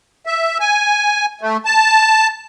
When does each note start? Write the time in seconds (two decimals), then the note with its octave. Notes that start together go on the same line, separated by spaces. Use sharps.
0.26 E5
0.60 G#5
1.41 A3
1.65 A5